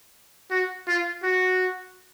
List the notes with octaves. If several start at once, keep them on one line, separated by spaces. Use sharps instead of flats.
F#4
F4
F#4